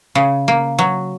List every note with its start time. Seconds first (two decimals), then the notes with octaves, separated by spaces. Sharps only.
0.15 C#3
0.48 A#3
0.79 F#3